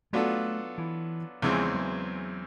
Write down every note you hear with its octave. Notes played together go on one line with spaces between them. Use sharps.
F#3 A3 B3 D4 F4 A4
E3
E2 C#3 E3 F3 G#3 C4
F#3